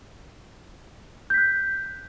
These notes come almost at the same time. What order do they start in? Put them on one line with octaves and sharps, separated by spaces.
G6 B6 F#6